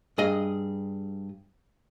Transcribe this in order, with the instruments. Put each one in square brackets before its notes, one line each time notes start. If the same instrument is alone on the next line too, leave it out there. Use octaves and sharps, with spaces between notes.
[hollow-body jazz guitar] G2 G#4 D#5